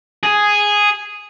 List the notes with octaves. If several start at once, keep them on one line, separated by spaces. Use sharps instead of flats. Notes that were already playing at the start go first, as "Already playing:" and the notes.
G#4